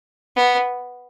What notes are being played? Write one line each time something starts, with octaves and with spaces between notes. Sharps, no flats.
B3